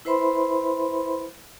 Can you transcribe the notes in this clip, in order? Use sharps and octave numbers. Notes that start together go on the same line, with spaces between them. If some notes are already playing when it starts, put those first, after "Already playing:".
E4 B4 C5 E5 B5 C6